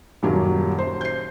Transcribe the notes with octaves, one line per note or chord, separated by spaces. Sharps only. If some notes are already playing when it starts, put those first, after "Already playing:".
D#1 F#2 F#3 G4
C5
G6 C7